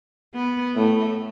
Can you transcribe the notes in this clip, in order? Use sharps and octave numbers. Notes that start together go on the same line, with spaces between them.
B3
A2 A3